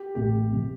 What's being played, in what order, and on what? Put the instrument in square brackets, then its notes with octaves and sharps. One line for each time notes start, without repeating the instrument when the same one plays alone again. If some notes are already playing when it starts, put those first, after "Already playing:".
Already playing: [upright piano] G4
[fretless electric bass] A1 A2 A3 C4 [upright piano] G4
[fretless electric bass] C3 F3 C4